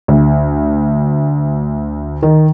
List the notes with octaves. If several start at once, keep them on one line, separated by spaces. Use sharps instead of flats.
D2
D#3